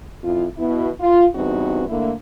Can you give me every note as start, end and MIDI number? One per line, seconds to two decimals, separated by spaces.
0.24 0.45 41
0.24 0.45 64
0.24 0.45 65
0.58 0.90 47
0.58 0.90 64
1.00 1.26 65
1.35 1.84 40
1.35 1.84 43
1.35 1.84 60
1.35 1.84 63
1.35 1.84 66
1.89 2.12 50
1.89 2.12 57
1.89 2.12 58
1.89 2.12 64